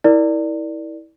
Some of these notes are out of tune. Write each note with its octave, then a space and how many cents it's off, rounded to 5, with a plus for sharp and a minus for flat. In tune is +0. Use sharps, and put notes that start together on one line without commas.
E4 -25 A#4 +0 D5 +0